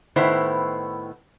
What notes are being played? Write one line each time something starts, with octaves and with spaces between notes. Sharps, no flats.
A2 D#3 B3 E4 C5